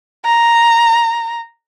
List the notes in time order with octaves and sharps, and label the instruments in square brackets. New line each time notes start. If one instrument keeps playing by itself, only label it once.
[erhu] A#5